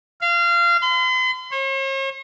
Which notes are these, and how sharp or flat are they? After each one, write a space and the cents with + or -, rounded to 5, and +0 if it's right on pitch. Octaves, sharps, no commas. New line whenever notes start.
F5 -25
C6 -45
C#5 -45